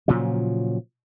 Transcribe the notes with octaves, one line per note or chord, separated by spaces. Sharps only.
A#2 C#3 F3 F#3